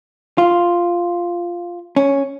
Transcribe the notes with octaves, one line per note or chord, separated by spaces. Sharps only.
F4
C#4